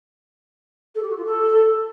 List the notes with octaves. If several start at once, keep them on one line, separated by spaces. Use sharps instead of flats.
A4
G4
F#4
F4
A4